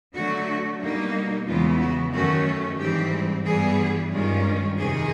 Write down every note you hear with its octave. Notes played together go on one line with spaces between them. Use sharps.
D3 F#3 A3 F#4
B2 G3 A#3 D#4
E2 C#3 E3 G#3 B3 F4
F#4
F#2 D#3 F#3 A3 C#4 F#4
G#2 E3 G3 C4 G4
G2 E3 G3 B3 G#4
G2 D#3 G#3 C#4 F4
F2 C3 D#3 G#4